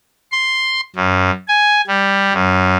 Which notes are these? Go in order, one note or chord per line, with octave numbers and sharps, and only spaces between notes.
C6
F#2
G#5
G3
F#2